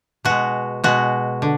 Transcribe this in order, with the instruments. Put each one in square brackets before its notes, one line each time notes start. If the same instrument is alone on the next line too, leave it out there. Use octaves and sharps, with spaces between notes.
[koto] B2 G#3 F#4
B2 G#3 F#4
D3